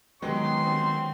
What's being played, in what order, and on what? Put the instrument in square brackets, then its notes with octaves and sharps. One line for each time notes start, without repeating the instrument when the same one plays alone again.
[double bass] D#3 C#4 [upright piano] F#3 G#3 B3 [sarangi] G4 [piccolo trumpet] C6
[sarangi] C4